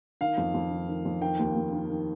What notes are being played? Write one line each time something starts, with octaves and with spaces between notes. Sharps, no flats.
D#3 F5
F2
F2
D#3
D#3
F2
D#3 G5
D#2
D#2
D#3
D#3